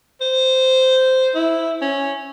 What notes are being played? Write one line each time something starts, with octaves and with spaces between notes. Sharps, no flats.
C5
E4
C#4